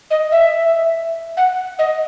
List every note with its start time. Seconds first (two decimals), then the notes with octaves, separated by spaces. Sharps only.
0.10 D#5
0.31 E5
1.36 F#5
1.78 D#5